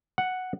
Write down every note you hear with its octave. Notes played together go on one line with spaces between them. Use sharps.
F#5